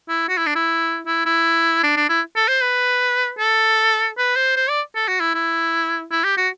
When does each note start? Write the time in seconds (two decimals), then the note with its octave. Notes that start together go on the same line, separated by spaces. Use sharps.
0.09 E4
0.29 F#4
0.37 E4
0.46 D4
0.55 E4
1.07 E4
1.26 E4
1.83 D4
1.97 D4
2.09 E4
2.36 A4
2.48 C5
2.62 B4
3.39 A4
4.17 B4
4.36 C5
4.56 C5
4.69 D5
4.95 A4
5.08 F#4
5.20 E4
5.34 E4
6.12 E4
6.24 G4
6.37 F#4